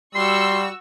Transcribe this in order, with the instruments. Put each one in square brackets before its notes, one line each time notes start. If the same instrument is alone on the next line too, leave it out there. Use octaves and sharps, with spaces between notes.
[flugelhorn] G3 [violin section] F#4 C#6 E6 [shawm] C6